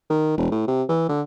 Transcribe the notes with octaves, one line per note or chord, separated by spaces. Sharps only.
D#3
E1
A2
C3
E3
D3